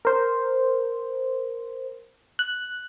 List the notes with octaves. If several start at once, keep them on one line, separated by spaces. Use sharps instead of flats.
A#4 C5
F#6